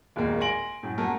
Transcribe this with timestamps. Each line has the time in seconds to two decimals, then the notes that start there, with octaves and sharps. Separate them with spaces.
0.16 D#1 G#1 G#3 A#3
0.40 G#5 C6 A#6 D7 F#7
0.83 F#2 A2
0.98 A3 A#3 F#4 A4 A#4